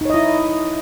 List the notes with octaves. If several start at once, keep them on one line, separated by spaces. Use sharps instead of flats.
D#4 E4 C#5 D#5